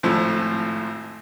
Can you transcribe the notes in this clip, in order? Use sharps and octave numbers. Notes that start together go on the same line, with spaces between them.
G#1 F2 A2 F3 A4